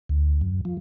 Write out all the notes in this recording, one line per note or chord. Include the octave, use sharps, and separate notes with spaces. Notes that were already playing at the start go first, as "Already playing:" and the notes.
D2
F#2
F3